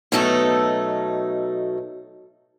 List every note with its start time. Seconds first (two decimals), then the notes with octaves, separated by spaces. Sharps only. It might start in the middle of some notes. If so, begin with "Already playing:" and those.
0.12 B2 F#3 A3 D#4 A4